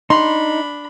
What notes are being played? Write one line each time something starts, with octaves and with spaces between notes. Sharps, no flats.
D4 D#4 B5 C6